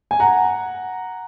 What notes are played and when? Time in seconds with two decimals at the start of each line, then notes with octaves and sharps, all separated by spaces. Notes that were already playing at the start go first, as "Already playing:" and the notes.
0.11 G#5
0.20 F#5 A#5